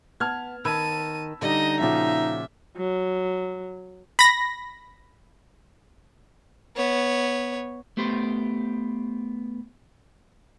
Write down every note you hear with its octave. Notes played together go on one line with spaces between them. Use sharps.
B3 A5 F6 G#6
D#3 A5 B5 E6 G#6 D#7
D3 G3 D#4 D#5
A#2 C#3 F3 C4 F#4 E5
F#3
B5 A#6
B3 C#5
A3 B3 G4 C5